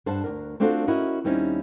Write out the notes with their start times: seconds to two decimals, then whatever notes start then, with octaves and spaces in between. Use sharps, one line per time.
0.06 G2 D4 C5 F#5 A5
0.24 D2 G#2 A#4
0.60 A3 C4 D4 F4 F#4 A4
0.87 C#4 E4 F#4 A#4 D#5
1.24 D#2 G3 C4 C#4 D#4 E4